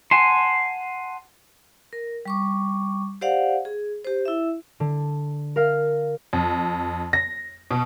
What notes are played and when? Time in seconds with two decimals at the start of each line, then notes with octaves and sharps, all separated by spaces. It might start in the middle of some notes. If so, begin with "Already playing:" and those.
0.11 F#5 G#5 A5 C6
1.93 A#4
2.25 G3 C#6 D6
3.21 G4 C5 D5 F5 F#5
3.65 G#4
4.05 G4 C5
4.25 E4 E5
4.80 D3
5.56 A#4 F5
6.33 F2
7.13 A#6
7.71 B2